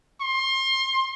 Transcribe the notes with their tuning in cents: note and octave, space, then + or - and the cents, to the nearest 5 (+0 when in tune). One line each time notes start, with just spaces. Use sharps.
C6 +30